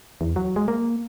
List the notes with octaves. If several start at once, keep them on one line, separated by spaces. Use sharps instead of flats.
E2
F#3
G#3
A#3